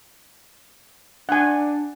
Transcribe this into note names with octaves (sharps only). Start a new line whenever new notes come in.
D4 F#5 G#5